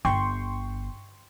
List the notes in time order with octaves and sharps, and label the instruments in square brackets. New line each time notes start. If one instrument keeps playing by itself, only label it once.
[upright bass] G1 [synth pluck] G5 C6 C#6